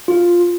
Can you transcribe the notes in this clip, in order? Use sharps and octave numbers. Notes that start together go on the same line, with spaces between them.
F4